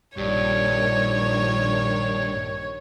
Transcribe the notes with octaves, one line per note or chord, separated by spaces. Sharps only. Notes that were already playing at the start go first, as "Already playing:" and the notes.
A#1 G2 D#3 G4 C#5 D5